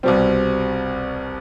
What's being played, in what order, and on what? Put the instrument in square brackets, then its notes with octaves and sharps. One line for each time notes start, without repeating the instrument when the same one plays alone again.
[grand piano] C2 B2 G3 [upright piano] C4